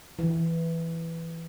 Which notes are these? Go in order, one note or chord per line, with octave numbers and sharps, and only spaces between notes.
E3